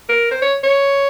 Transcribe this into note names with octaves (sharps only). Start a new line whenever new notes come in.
A#4
C5
C#5
C#5